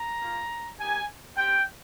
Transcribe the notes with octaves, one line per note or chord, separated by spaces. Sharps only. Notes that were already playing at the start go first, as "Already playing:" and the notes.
Already playing: A#5
A#3 F4
A#3 D#4 G4 G#5
C4 G4 G5